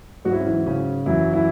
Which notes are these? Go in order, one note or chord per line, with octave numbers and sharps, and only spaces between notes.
G#2 F#3 F#4
E4
C#4
E3 E4
C#3 C#4
F#2 E3 F#3 E4
E3 E4